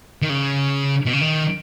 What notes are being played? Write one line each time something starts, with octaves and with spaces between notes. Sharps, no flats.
D#3
C#3
B2
C#3
D#3